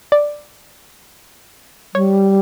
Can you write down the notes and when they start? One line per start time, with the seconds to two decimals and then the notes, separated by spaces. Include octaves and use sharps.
0.12 D5
1.94 G3 C#5